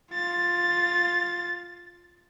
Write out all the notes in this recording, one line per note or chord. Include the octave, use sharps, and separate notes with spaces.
F4 A6